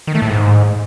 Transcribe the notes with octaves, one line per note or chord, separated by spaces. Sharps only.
D#3
A3
A2
G#2